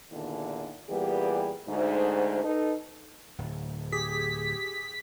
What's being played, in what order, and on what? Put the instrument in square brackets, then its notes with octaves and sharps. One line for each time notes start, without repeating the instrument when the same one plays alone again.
[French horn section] E2 A#2 D3 D#3
A#2 E3 G3 B3 G4 G#4
D2 G#2
D#4 A4 B4
[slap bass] D1
[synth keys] G4 G#4 [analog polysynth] B6